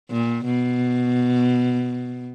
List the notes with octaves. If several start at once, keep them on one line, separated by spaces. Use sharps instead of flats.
A#2
B2